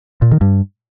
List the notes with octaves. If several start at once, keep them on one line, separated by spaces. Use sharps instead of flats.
A#2
D#3
G2